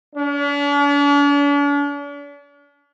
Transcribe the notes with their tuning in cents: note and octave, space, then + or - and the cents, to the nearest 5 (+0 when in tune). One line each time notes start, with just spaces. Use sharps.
D4 -45